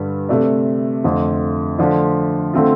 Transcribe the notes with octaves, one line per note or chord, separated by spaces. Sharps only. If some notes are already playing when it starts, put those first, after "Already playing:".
Already playing: G2 D3 G3
C3 A3 D4
F2 D3 A3 F4
D3 F3 A3 D4 F4
D3 A3 C4 F4